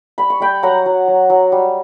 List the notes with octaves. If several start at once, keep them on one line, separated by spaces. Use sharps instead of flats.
G3 B5
C#6
G3 G5 B5
F#3 F#5 A#5
F#3
F#3
F#3
G3